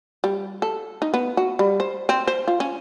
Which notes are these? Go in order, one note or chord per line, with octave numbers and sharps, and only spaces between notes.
G3
A4
D#4
B3
F#4
G3
C5
C4
C5
F4
C#4